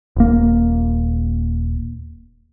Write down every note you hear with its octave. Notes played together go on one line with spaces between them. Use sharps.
D#1 A#3